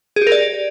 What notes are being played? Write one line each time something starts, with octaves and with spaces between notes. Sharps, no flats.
G#4
G4
A#4
D5